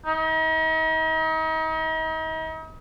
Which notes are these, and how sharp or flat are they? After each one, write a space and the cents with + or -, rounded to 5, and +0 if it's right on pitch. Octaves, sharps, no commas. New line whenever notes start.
D#4 +40